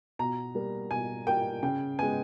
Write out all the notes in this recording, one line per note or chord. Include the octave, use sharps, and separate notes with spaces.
B2 A#5
G3 A#3
B2 G#5
G3 A#3 G5
C#3 G5
G#3 B3 G#5